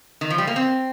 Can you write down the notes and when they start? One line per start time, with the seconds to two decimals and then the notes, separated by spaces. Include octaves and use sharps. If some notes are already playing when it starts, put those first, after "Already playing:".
0.21 D#3
0.30 F3
0.38 G3
0.47 A#3
0.56 C4